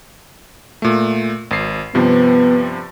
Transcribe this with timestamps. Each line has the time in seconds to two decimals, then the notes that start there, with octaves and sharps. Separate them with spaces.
0.82 A#2 A3
1.51 G#1 C7
1.95 G2 C3 F3 B3